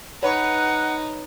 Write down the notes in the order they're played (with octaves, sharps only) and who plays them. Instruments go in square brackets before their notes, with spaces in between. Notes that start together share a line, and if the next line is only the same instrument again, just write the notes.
[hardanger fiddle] D#4 [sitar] B4 C#5 [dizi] F#5